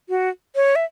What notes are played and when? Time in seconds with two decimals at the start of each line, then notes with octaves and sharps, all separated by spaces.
0.09 F#4
0.56 C#5
0.76 E5